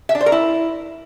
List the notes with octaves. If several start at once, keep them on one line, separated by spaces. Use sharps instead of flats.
E5
D4
C5
A#4
E4